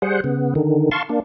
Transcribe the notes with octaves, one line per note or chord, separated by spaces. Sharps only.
G3 G#4 C5 F#5
C#3 B3
D3 D#3
F5 A5 C6 C#6
A#3 D4